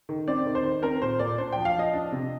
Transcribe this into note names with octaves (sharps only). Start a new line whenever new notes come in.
D#3
C4 D5
D#3
C5
D#3
C4 A#4
A#2 C5
A#2 D5
D4 C5
F3 G5
F5
F3 D#5
D4
C3